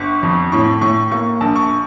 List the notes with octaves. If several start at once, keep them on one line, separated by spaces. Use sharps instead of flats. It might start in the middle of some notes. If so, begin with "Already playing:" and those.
Already playing: G1 C#6
F2
A2 C#6
A2 C#6
A#3 C#6
A#1 A5
C#6